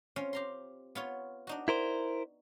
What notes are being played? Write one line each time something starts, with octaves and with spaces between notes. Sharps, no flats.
C4 C#4 F4
G4 A#5 C6
B3 F4 C#5
D4 D#4 F#4
E4 A#4 C5